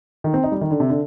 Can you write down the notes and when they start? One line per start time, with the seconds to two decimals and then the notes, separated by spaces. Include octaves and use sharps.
0.24 D#3
0.34 C4
0.44 D#4
0.52 G3
0.61 D#3
0.71 D3
0.80 C3
0.90 D3